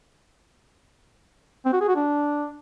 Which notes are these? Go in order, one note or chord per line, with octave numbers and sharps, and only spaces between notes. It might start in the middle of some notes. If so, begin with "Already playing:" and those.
C4
F#4
G#4
F#4
D4